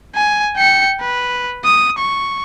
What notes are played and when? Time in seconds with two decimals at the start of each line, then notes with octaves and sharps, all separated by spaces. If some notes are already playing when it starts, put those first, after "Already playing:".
0.16 G#5
0.56 G5 C#7
1.00 B4
1.64 D#6
1.99 C#6